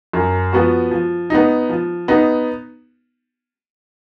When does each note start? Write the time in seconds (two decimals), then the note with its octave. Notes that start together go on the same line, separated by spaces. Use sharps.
0.13 F#2
0.53 F3 B3 F#4
0.91 F3
1.30 B3 D#4
1.69 F3
2.08 B3 D#4